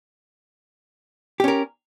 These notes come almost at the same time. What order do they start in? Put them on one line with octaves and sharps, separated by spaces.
G4 C#4 A#4